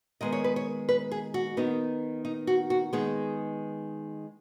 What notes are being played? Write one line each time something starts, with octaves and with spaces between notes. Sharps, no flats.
D#3 G#3 B3 D#5
C#5
B4
C#5
B4
G#4
F#4
D#3 B3 D#4
D#4
F#4
F#4
D#3 G#3 B3 D#4 G#4